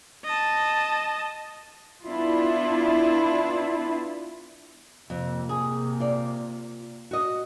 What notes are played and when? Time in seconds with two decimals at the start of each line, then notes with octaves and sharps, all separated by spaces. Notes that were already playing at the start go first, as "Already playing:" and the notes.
0.25 D#5 A5
2.05 B3 D4 E4 F4
5.10 F2 C3 A#3
5.49 G#4
6.00 F4 D5
7.11 F#4 D#5